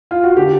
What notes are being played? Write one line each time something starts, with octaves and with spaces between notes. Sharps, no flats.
F4
F#4
D3 G4